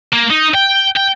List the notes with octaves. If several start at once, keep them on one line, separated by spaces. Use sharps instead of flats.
A#3
D#4
G5
G5